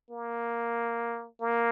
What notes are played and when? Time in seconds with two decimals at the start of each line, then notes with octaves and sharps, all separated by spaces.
0.11 A#3
1.41 A#3